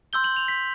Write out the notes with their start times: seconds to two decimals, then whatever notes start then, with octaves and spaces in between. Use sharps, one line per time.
0.13 C6 E6 G6 G7
0.24 F#7
0.37 F7
0.48 B6